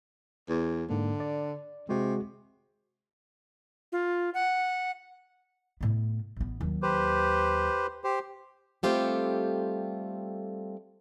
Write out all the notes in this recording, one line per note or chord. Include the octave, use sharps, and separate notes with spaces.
E2
G#2 D3 A#3
D5
C3 G#3 F#4 G#4
F4
F#5
A2 B3
A1 B3
D#2 F#3
G4 B4 C5
G4 C5
G3 A3 C4 F4 G4 A4